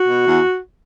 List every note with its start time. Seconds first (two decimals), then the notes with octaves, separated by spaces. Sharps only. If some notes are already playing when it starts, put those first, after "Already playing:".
Already playing: F#4
0.09 B2
0.26 E2